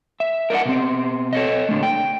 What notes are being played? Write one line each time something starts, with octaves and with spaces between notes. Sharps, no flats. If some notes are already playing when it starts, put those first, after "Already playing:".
E5
A#4 D5 D#5 F#5
B2 C4
A4 C#5 D#5
A#2 D3 A3
G5